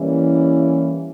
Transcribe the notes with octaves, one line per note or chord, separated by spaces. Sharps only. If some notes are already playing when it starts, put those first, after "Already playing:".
Already playing: E3 G3 A#3 C#4 E4